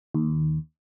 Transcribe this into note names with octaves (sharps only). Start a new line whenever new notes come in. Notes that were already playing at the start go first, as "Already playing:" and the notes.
D#2